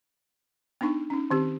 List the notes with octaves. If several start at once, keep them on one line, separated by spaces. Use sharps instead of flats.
B3 D4 D#4 C#6
C#4 D#4
D#3 C4 G4